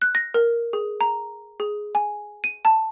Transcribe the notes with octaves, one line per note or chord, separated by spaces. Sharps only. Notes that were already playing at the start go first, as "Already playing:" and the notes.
F#6
A#6
A#4
G#4
A#5
G#4
G#5
D#7
A5